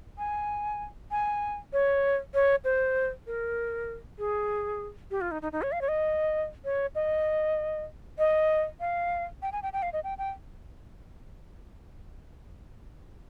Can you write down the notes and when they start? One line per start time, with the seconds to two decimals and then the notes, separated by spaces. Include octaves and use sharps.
0.18 G#5
1.11 G#5
1.73 C#5
2.34 C#5
2.64 C5
3.27 A#4
4.19 G#4
5.11 G4
5.21 F4
5.31 D#4
5.42 D#4
5.52 D#4
5.62 C#5
5.72 F5
5.81 C#5
5.88 D#5
6.65 C#5
6.95 D#5
8.18 D#5
8.80 F5
9.42 G5
9.53 G#5
9.63 G5
9.73 G5
9.82 F5
9.93 D#5
10.04 G5
10.18 G5